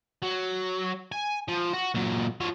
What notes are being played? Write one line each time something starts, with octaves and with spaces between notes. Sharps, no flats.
F#3
G#5
F3
F#4
A#2 F#3
F3 C#5